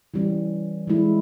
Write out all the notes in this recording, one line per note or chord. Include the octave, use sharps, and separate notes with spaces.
E3 G3 C#4
E3 G#3 E4